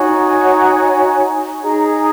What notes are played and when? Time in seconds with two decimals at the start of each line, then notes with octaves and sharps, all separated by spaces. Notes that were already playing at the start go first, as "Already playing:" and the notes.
Already playing: D#4 F#4 C#5 G#5
1.60 D#4 G#4 D#5 A#5